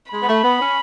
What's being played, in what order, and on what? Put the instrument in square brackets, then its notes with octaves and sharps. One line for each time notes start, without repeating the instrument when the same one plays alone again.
[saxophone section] G#3 [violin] B5
[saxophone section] B3
A3
B3
C#4